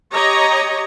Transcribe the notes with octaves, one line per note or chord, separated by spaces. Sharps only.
G4 C#5 D#5 A#5